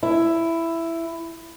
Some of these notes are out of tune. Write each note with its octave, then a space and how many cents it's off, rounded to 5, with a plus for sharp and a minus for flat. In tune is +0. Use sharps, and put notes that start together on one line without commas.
E4 +10